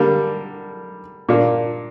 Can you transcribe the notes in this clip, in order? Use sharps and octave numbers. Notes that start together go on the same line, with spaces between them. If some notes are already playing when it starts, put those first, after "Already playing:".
Already playing: D3 G3 A#3
A#2 A#3 D4